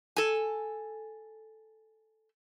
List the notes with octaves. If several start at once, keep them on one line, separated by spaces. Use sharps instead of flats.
A4 G#5